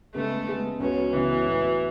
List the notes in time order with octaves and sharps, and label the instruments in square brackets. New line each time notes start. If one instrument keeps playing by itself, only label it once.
[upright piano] C#3 G#3 B3 [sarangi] A3
[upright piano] C#3 G#3 B3
[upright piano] C#2 C#3 F#3 B3 [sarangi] C#4
[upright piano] C#2 C#3 F#3 B3 [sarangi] E3
[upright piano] A2 F#3 B3